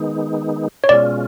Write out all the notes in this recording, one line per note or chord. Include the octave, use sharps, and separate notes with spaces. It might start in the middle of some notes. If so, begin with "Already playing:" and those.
Already playing: D#3 G#3 B3 D#4
C#5
B2 G#3 C#4 F4 D5